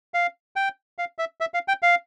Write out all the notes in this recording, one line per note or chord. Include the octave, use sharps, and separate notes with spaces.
F5
G5
F5
E5
E5
F5
G5
F5